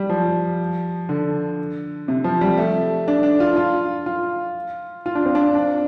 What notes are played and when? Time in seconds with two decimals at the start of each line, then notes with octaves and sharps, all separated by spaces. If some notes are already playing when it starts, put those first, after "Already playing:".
Already playing: G3
0.10 F3
1.09 D3
2.08 C3
2.24 F3
2.41 G3
2.58 A3
3.08 D4
3.23 D4
3.40 F4
3.57 F4
4.06 F4
5.06 F4
5.15 D4
5.25 C4
5.35 D4
5.55 D4